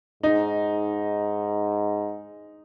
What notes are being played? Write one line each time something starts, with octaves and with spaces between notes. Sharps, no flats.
G#2 D#4